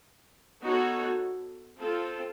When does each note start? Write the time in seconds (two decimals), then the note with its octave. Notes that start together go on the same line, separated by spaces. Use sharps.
0.64 B3 D#4 F#4 A4 C#5
1.80 C4 F4 A4